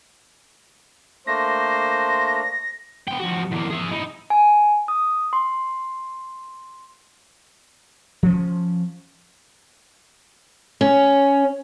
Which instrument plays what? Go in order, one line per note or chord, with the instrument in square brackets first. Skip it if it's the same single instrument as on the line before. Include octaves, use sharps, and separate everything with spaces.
[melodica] A3 A#3 D4 [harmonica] C5 [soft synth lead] A#6
[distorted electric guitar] B3 G5
F2 F#4
E2 A#3
G#4 E5
D#4 E4
[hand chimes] G#5
D#6
C6
[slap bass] F3 C#4
[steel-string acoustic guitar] C#4